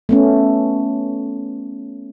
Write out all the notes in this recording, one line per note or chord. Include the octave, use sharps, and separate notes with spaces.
A3 B3 C#4